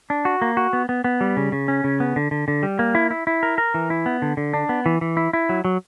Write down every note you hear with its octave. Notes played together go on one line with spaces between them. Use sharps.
D4
F#4
A#3
F#4
B3
B3
B3
G3
C#3
C#3
C#4
C#3
B3
D3
D3
D3
G3
A#3
E4
E4
E4
A#4
A#4
E3
E4
B3
D3
D3
D4
B3
E3
E3
E4
E4
F#3
F#3